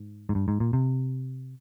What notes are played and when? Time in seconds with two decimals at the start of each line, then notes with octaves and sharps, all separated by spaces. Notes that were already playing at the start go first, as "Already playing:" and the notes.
Already playing: G#2
0.29 G#2
0.35 G2
0.48 G#2
0.60 A#2
0.73 C3